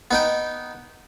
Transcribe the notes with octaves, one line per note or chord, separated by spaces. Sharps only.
B3 D#4 G5